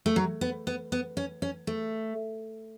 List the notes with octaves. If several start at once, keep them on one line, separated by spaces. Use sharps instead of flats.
A3
F#3
B3
B3
B3
C#4
C#4
A3